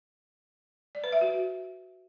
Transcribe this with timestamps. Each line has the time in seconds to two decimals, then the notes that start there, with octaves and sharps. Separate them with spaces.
0.95 D5
1.04 B4
1.12 E5
1.21 F#4